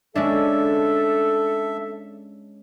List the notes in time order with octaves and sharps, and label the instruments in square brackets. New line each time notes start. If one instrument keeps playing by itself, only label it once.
[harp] G#3 C#4 D4 [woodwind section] A4 [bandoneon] E5